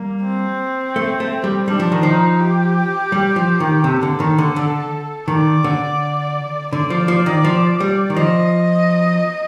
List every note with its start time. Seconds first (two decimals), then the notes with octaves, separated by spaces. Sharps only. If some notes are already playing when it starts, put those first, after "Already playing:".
Already playing: G3 A#3
0.24 C4
0.96 A3
1.20 A3
1.44 G3
1.68 G3 D4
1.80 F3
1.92 D#3
2.03 F3 D#4
2.40 G4
3.12 G3
3.36 F3
3.60 D#3
3.84 C3 A4
4.03 D3
4.20 D#3
4.38 D3
4.56 D3
5.28 D#3 D5
5.64 D3
6.72 D3 D5
6.90 F3
7.08 F3
7.26 D#3
7.44 F3
7.80 G3
8.10 D#3
8.16 F3 D#5